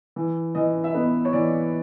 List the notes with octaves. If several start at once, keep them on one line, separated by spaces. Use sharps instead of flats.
E3
E3 D#5
E5
B3 D#5
C#5
E3 D5